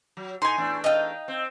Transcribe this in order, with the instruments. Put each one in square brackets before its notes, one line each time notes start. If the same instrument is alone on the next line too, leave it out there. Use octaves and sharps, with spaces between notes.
[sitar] F#3
[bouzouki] A2 [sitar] D#4 [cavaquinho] G#5 C6
[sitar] E2 A3 D4
[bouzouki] D#4 F5 [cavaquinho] D#5 G5
[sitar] C4